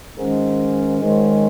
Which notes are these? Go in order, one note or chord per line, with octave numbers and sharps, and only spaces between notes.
G#2 D#3 G#3 C#4
G#2 D#3 G#3 C#4